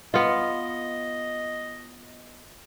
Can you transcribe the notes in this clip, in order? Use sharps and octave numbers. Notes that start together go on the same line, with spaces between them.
B3 F4 D#5